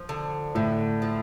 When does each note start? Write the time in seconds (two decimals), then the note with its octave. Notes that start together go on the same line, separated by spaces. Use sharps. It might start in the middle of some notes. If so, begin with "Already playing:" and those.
Already playing: F3
0.09 D3
0.55 A2 D3
1.02 F3